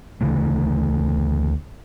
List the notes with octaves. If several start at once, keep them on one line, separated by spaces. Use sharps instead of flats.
D2 C#3 E3 A3